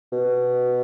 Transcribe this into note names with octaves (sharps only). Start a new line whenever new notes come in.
B2